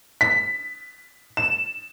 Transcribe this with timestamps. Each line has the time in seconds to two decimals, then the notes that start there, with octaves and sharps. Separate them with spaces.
0.21 B6
1.37 E7